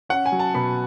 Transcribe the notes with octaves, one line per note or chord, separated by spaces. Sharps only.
C#4 F#5
G#5
F#3
A5
B2 B5